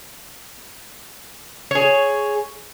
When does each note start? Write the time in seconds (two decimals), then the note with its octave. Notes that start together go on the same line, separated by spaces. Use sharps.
1.71 G#4 C#5